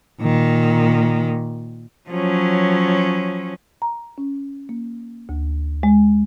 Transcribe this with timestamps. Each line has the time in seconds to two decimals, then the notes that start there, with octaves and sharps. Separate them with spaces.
0.21 A#2 D#3
2.10 F3 F#3 C#4
3.82 A#5
4.18 C#4
4.69 A#3
5.29 D2
5.83 G#3